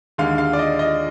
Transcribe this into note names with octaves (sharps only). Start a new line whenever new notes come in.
D#2 D3 G#3 F5
F5
D5
D#5
D#5